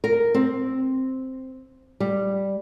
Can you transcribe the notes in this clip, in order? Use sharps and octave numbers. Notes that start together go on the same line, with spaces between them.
A#4
C4
G3